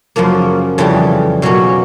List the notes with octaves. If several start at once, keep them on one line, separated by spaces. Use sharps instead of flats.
F#2 C#3 F3 A#3
F2 C#3 E3 G3
B2 F#3 A#3 C#4